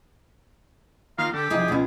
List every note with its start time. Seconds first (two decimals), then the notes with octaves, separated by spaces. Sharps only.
1.18 D#3 A#3 F4 F5
1.34 D3 G4 A4
1.50 C2 C#3 F3 D#4 G#4
1.68 C#2 B2 G#3 F4